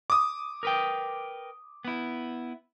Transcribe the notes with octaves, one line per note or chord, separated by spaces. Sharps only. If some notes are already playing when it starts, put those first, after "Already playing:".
D6 D#6
A#4 B4 G5
B3 E4